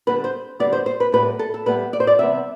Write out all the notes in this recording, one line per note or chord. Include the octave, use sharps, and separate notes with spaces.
D3 G3 B3 B4
C5
D3 G3 B3 D5
C5
C5
B4
A2 G3 B3 B4
A4
A4
A2 G3 B3 B4
D5
C5
D5
C3 E3 G3 B3 E5